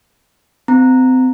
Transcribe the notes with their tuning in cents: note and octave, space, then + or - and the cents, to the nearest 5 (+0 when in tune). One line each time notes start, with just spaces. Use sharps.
C4 -30 A#5 -10